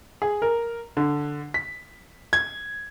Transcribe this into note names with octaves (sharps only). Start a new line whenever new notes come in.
G#4
A#4
D3
B6
G#6